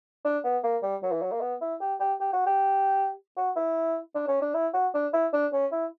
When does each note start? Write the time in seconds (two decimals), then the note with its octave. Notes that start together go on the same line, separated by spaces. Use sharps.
0.25 D4
0.44 B3
0.64 A#3
0.83 G3
1.03 F#3
1.12 E3
1.22 F#3
1.32 A#3
1.41 B3
1.61 E4
1.81 G4
2.00 G4
2.20 G4
2.33 F#4
2.46 G4
3.37 F#4
3.56 E4
4.15 D4
4.28 C#4
4.42 D4
4.54 E4
4.74 F#4
4.94 D4
5.13 E4
5.33 D4
5.53 C#4
5.72 E4